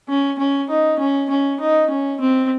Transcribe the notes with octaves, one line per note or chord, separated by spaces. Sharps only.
C#4
C#4
D#4
C#4
C#4
D#4
C#4
C4